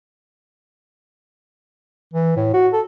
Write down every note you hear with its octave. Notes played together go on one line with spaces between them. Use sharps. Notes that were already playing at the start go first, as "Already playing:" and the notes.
E3
A2
F#4
A4